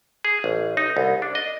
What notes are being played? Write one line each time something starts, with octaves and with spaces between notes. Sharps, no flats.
G#4
A1
D#4
C2
D4
D#5